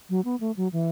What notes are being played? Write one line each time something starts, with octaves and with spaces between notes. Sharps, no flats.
F#3
B3
A3
F#3
E3